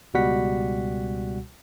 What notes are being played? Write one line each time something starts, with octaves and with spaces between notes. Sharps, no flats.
C#2 B2 G3 F#4 F#5 B6